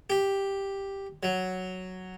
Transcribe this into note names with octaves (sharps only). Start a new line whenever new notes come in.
G4
F#3